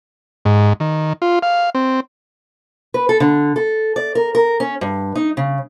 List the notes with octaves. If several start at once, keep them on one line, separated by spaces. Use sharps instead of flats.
G#2
D#3
F4
F5
C4
B4
A4
D3
A4
D5
A#4
A#4
C#4
G2
D#4
C#3